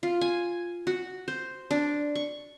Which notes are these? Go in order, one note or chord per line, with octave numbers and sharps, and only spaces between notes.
F4
G#5
F#4
C5
D4
C#6